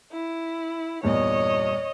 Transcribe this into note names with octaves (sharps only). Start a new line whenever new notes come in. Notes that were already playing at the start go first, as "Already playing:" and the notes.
E4
E2 G2 A#2 C#5 D#5